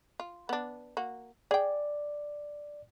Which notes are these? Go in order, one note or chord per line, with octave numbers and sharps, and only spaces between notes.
F4
B3 D4
A#3 F#4
G#4 D5 G5